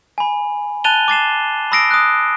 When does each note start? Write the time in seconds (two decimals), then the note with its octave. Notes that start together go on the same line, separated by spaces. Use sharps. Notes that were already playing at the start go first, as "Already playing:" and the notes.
0.18 G#5 B5
0.84 A5 F#6 A6 D#7 F7 G7
1.08 D6 A6 C7 E7
1.72 B5 D#6 E6 A#6 C7 D7
1.91 D#6 F#6